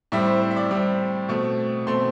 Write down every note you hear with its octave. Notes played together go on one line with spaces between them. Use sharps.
A2 G3 C4 E5
C5
C5
E5
D5
A2 G3 C4
B2 A3 C4
B2 A3 C4 C6